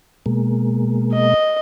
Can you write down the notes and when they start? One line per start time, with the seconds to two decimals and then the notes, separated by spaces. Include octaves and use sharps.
0.26 B2 G#3 A#3
1.14 D#5